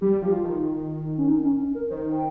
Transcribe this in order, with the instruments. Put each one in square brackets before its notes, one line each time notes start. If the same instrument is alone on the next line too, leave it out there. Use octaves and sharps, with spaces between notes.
[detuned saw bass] G3 [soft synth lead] G4
[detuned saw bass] F3 [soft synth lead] G4
[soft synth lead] F4
[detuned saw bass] D#3
[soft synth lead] C#4
D#4
C#4
C#4
A#4
[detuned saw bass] D#3 [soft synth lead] C5
[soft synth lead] G5